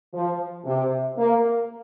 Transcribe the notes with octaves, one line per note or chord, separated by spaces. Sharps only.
F3
C3
A#3